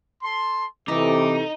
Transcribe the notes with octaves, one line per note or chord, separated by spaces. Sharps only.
A4 A5 C6
C3 E3 A3 D#4 A4 D6